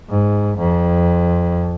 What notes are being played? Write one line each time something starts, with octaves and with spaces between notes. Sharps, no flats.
G#2
F2